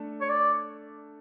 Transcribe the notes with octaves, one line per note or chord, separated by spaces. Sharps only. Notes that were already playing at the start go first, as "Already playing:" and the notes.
Already playing: A3 D4 A4
C#5
D5